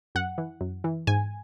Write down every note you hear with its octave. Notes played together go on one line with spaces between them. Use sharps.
F#2 F#5
E3
F#2
E3
G#2 G#5